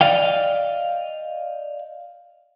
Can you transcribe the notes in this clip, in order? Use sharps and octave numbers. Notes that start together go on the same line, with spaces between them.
D5 D#5 F5 G5